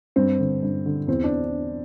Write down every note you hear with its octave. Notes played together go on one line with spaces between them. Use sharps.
G2 C4
D3
G2
D3
E2 C4
D4